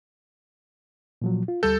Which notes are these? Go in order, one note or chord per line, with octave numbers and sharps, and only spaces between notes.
A#2 F3 F#3
F4
D2 G3 A4 G6